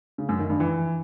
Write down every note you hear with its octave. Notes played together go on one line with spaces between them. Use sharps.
C#3
F#2
D#3
G2
E3